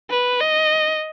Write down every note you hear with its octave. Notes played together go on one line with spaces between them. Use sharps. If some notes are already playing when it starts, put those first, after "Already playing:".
B4
D#5